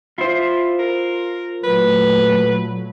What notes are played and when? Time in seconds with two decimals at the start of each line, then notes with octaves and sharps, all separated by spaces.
0.18 E4 F4 C5
0.79 A#4
1.64 A#2 F#3 A3 B4